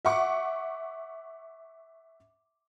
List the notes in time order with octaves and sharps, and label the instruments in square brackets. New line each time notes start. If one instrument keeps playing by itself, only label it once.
[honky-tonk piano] E5 F#5 C#6 D6